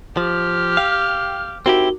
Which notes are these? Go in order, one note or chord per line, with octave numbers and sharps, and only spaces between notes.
F3 G4 F6
F5 G5
C4 D#4 E4 F#4 G4 A#4 G7